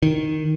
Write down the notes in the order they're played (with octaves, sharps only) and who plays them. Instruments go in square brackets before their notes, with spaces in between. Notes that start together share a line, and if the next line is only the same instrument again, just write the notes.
[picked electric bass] D#3